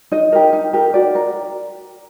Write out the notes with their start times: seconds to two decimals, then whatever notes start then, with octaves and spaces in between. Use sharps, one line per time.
0.12 D#4 D#5
0.32 G4 A#4
0.53 D#4
0.73 G4 A#4
0.94 F#4 D5
1.15 A#4